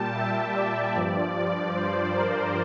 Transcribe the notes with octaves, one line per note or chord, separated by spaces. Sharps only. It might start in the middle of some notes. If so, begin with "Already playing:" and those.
Already playing: A#2 G3 G5 A5
E5
D5
G2 F3 D5
D5
C5
A#4